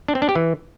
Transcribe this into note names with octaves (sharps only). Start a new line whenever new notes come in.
D4
C4
D4
G4
E3